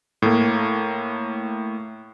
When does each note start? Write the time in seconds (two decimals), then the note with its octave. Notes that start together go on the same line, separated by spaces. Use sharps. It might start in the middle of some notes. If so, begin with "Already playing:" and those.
0.22 A2 A3 A#3